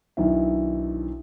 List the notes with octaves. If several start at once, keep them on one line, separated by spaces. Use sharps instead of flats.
B1 D#3 D4 E4 E5